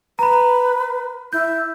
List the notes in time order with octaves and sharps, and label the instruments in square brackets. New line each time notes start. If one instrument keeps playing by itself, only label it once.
[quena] B4 [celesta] A#5 B5
[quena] E4 [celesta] G6